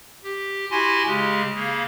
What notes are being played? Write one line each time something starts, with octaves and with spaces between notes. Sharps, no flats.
G4
E4 F#4 G4 G#5 C6
C#3 G#3 G4
C#3 A#3